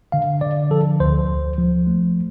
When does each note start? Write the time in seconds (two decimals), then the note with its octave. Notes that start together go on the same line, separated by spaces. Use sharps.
0.12 D3 F5
0.41 D3 D5
0.70 F3 A4
1.00 D2 C5
1.28 D2
1.58 F3
1.87 A3